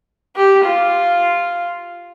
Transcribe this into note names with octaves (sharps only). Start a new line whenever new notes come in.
G4
F4